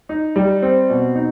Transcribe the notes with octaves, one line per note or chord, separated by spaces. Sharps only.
D#4
G3
C4
B2
D#4